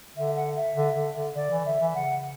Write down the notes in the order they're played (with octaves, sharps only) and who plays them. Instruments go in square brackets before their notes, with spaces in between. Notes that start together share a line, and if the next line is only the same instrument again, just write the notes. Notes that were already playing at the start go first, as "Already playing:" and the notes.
[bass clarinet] D3 [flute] E5
[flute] F#5
E5
[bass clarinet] D3
D3
D3
[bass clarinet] D3 [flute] D5
[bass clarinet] E3
[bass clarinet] D3 [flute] E5
[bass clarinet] E3
[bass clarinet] C#3 [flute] F#5